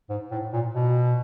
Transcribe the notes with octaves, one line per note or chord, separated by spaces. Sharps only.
G#2
A2
A#2
B2